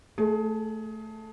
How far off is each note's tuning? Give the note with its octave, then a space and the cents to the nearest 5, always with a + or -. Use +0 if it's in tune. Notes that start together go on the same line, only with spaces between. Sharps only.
A3 +0 G#4 +25